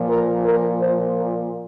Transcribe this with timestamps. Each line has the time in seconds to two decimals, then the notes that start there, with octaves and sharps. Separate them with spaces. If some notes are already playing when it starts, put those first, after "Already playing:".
Already playing: A#2 F3
0.08 A#4
0.44 A#4
0.79 C5
1.15 A#4